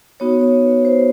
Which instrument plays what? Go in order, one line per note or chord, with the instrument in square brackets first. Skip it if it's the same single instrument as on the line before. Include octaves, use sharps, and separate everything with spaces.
[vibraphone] B3 D#4 F#4 C#5
C#5
B4
C5